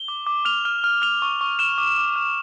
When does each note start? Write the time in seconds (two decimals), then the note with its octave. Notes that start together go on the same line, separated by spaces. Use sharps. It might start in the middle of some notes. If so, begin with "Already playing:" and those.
Already playing: G7
0.08 D6
0.27 D6
0.45 F6 F7
0.65 F6
0.84 F6
1.02 F6 F7
1.22 C#6
1.41 C#6
1.59 F6 E7
1.78 D6
1.98 D6
2.16 F6